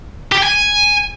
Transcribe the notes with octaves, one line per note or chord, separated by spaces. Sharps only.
G4
G5
G#5